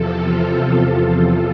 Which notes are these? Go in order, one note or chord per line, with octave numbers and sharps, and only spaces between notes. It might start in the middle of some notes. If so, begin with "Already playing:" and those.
Already playing: E2 C3 F3 A4
F4
F4